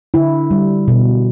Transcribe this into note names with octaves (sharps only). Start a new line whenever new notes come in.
D3 E4
G3
B2